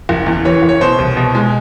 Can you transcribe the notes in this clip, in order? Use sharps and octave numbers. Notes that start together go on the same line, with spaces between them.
F#1
E2
E3 C#5
F#1
C#5
B2 C5
C2
B2
G#3